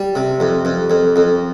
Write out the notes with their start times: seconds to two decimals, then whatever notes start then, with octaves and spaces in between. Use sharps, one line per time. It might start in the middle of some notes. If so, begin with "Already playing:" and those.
Already playing: G3
0.15 C3
0.40 F2
0.65 F2
0.90 F2
1.16 F2